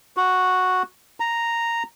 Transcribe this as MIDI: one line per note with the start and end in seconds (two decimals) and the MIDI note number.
0.17 0.83 66
1.20 1.83 82